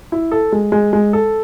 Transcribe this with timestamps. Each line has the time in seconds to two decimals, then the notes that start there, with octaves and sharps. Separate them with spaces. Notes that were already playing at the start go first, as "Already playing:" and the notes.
0.12 E4
0.31 A4
0.52 G#3
0.72 G#3
0.93 G#3
1.13 A4